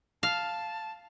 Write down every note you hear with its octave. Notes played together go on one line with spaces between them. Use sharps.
F5 A5